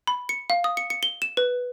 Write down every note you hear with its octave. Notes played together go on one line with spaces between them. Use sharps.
B5
C#7
F5
D#6
C#7
C#7
G7
E7
B4